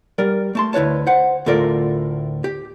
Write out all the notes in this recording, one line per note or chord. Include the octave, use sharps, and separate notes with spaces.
G3 A#4 D5
A3 A5 C6
D2 E4 B4 C#5 A5
C5 F#5
D2 A2 F4 A4 A#4 D5
G4